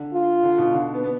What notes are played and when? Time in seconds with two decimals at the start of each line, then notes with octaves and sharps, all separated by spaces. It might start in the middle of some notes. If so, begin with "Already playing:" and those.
Already playing: D3
0.13 F4
0.43 D3
0.58 B2
0.73 D3
0.94 B3
1.04 B3